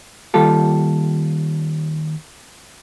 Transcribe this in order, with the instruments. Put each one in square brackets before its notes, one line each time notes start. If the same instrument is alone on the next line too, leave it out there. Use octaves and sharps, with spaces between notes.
[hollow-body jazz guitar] D#2 G3 F4 A4